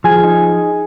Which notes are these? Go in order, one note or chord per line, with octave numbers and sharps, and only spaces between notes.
F3 G#4 G#5
D#4